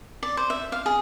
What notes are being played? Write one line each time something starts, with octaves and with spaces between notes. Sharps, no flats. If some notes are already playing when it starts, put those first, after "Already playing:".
D5
C5
E5
F5
G#4